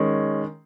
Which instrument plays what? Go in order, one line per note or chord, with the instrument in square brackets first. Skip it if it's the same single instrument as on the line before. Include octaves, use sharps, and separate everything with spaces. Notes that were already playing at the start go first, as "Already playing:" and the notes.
Already playing: [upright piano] D#3 G#3 C#4